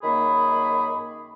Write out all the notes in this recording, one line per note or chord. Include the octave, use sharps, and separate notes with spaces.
F#2 D#3 A#3 G#4 B5